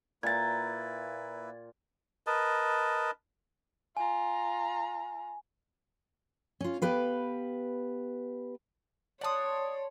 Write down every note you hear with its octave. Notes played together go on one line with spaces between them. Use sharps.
A#2 A#3 E4 B4 G5 G#6 A6
A#4 B4 D#5 A5
F4 G#5 A#5
C#4 F4
B3 G4 B4 F5
C#5 D5 F#5 A5 C6 D#6